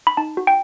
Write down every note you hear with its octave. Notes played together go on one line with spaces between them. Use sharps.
B5
D#4 A5
F#4
G5